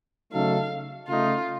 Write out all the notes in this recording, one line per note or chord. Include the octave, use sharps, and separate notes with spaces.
C#3 F#3 A3 D#4 A4 F5
C#3 A3 D#4 F4